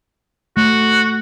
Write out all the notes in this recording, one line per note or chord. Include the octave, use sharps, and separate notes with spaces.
A3 F#4